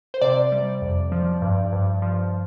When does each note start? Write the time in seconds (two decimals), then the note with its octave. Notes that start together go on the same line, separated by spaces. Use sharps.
0.14 C5
0.22 C3 D5
0.52 G3
0.82 F2
1.12 F3
1.42 G2
1.72 G2
2.02 F3